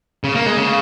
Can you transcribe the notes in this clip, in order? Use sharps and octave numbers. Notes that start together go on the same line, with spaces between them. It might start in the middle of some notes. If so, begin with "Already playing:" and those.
C#3
A#3
G#3
C#3